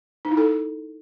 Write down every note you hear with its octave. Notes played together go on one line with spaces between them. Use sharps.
D#4
E4
A4